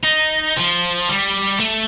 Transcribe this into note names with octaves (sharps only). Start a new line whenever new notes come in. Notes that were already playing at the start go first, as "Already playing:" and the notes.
D#4
F3
G3
A3